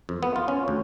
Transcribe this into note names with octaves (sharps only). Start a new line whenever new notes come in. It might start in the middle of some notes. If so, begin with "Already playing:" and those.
F2
B3
F4
C#4
D2